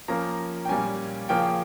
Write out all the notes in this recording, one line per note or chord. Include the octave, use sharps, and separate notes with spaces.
F3 A#3 C#4 A#5
G5
A#2 G3 A#3 C#4 G#5
C#3 F3 A#3 C#4 G5